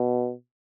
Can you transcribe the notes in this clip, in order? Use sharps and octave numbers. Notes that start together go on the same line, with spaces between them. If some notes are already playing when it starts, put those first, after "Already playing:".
Already playing: B2